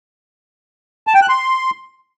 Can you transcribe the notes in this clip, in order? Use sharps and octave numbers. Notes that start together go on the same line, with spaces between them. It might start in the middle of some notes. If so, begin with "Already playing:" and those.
A5
G5
F#6
C6